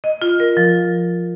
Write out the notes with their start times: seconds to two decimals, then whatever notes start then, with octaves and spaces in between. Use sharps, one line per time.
0.04 D#5
0.22 F4
0.40 A#4
0.57 F3